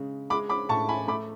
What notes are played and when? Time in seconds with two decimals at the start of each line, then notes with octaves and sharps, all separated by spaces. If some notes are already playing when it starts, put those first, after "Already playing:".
Already playing: C#3 G#3
0.30 G#3 B5 D6
0.49 B5 D6
0.69 A2 A5 C#6
0.88 G#5 B5
1.08 A3 B5 D6